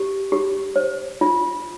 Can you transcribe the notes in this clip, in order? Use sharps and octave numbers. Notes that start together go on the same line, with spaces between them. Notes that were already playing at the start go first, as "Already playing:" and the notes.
Already playing: G4
G4
C5
F4